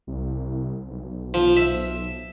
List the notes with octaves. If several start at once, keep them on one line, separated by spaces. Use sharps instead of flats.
C2
B1
F3
E5